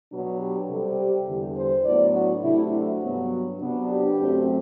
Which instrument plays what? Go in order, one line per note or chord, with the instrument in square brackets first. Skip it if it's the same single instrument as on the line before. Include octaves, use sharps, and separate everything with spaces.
[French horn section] B2 F#3 B3 D4
G4
C3 G3 C4 A4
G4
E2 D3 G3
C5
A2 F#3 B3 D4 D5
F#4
C3 F#3 A3 D4 E4
F#4
G2 F#3 B3
C3 F#3 B3 D4
G4
F#2 F#3 A3 C4